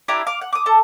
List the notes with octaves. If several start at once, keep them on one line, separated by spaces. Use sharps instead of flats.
D4 E4 G4 A#5
F5 D6
F#5
D6 D#6
A4 A5